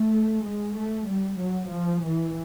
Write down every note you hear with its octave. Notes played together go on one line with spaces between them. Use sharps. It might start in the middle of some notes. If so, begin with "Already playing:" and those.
Already playing: A3
G#3
A3
G3
F#3
F3
E3